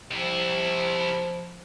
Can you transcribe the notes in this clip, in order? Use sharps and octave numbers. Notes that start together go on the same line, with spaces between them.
C3 F3 E4